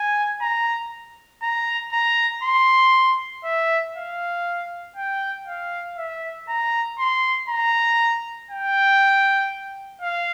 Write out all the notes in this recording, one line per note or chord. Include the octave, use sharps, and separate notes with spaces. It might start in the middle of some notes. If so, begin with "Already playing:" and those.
Already playing: G#5
A#5
A#5
A#5
C6
E5
F5
G5
F5
E5
A#5
C6
A#5
G5
F5